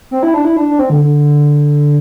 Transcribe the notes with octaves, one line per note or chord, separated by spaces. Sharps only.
C4
E4
D4
E4
D4
D4
C4
D3
D3